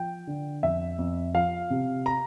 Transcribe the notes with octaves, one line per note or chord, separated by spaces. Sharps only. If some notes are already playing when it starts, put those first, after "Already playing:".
Already playing: F3 G5
D3
F2 E5
F2
F3 F5
C3
A#5